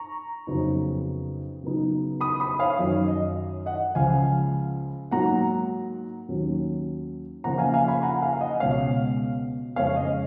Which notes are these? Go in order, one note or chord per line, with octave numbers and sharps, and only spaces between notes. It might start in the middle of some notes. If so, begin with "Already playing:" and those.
Already playing: A#5 C#6
F2 C#3 F#3 B3 D#4
C#3 F#3 B3 D#4
B5 D#6
B5 D#6
C#5 F5
F#2 D#3 F#3 C#5
D#5
D#5 F#5
C#2 C#3 F3 F5 G#5
G#2 F#3 A#3 F#5 A#5
D#2 D#3 F#3 C#4
C#3 F3 A#3 C#4 F#5 A#5
F5 G#5
F5 G#5
G#5 B5
F#5 A#5
F5 G#5
D#5 F#5
C#2 B2 G#3 C#4 C#5 F5
F2 C#3 G#3 C#4 C#5 F5
D#5